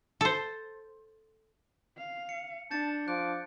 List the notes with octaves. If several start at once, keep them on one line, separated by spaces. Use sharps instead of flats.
A4 C5
F5
C#7
D4 A5 G6 A6 C#7
F3 D6 F#6